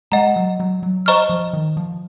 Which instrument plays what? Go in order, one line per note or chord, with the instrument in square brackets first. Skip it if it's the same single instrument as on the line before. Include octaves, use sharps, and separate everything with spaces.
[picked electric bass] G#3 [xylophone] D#5 F#5 A#5
[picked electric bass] F#3
F#3
F#3
[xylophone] C5 D#5 A#5 C#6 F6
[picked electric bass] F3
D#3
F3